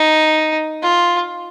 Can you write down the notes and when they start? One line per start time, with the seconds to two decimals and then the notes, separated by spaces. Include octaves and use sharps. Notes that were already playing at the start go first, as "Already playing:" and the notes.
Already playing: D#4
0.82 F4